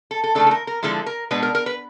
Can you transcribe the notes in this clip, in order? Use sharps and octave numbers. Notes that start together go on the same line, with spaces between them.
A4
A4
C#3 E3 A3 D4 A4
A4
A#4
A#4
D3 F3 G#3 C4 E4 A4
A#4
B2 G#3 B3 D4 B4
A#4
A#4
B4